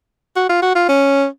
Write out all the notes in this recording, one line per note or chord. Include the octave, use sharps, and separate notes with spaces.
F#4
F4
F#4
F4
C#4